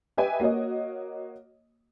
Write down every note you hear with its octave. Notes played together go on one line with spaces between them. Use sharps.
G4 B4 D#5 E5 G5 G#5
A#3 F#4 C#5 D#5